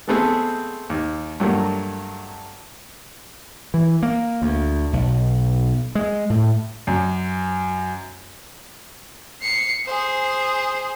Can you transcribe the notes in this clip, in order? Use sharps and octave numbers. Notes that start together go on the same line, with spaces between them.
G#3 A3 B3 C4 G#4 A4
D#2
G2 F#3 A3 A#3
E3
A#3
D2
B1
G#3
A2
F#2
C7 C#7
G#4 C5